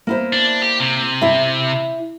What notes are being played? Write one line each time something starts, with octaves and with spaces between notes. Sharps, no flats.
A#3 E4 C5
D4
G4
C3
E4 E5